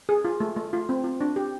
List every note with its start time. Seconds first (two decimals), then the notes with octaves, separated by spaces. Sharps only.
0.09 G#4
0.25 F4
0.40 A3
0.56 A3
0.73 F4
0.89 C4
1.04 F4
1.21 D4
1.36 G4